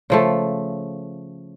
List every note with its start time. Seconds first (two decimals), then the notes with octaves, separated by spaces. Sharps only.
0.10 C#3 F3 A3